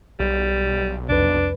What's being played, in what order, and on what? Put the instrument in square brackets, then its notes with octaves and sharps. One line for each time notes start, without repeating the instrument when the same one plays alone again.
[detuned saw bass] B1 [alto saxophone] G3
[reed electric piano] C2 F2 B4 [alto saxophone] D4